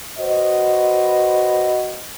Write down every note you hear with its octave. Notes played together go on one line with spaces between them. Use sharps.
F#4 B4 C5 D#5